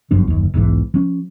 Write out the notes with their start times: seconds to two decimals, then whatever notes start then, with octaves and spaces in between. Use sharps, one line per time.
0.11 G1 F#2 F3 D4
0.27 F#1 D#2
0.54 E1 B1 G#2 E3
0.94 F3 C#4